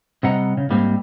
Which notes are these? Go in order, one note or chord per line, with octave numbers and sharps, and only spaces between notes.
C3 G3 D#5 F#5 A#5
C#3
G#2 G3 A#3 C4